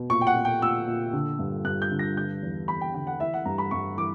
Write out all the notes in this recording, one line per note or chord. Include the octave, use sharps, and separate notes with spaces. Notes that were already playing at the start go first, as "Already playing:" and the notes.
Already playing: B2
A#2 C#6
G5
F#5
A#2
G5
A#2 E6
A#2
D3
G2
G2 F#6
G6
D3
A#6
D3 G6
E2
E2 B5
G5
D3 G5
F#5
E3 E5
F#5
G2 A#5
B5
G2 C#6
E3 D6